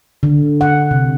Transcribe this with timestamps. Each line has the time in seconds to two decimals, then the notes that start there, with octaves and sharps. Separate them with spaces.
0.23 D3
0.61 F#5
0.91 C3